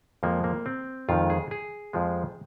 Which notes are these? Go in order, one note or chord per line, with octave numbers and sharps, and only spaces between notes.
F2 F3 G#3 A#3
A#3
C4
F2 D#3 G#3 F4
G#4
G#4
F2 F3 G#3